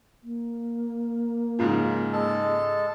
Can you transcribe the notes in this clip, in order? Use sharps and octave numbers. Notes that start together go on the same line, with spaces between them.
A#3
G#2 C#3 F3
G#3 A4 A5